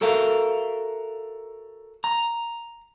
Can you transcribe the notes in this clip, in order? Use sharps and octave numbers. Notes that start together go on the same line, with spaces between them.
F#4 A4 A#4 E5 F5
A#5